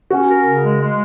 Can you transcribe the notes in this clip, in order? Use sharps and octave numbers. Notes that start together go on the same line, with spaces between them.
C#4 F#4
A#4
C#3
G#3
G#3